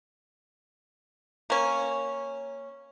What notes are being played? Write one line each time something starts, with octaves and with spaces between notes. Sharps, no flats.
A#3 C#4